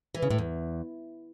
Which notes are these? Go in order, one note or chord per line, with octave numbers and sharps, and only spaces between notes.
E3
C#3
A2
E2